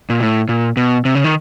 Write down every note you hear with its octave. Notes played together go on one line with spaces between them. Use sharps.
A#2
A2
A#2
B2
C3
C#3
D#3